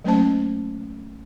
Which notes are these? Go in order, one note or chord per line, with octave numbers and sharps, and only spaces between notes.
F#3 A3 A#3 C#4 C5 A5